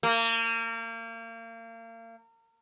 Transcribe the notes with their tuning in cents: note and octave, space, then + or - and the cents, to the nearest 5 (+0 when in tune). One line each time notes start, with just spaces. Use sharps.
A#3 -35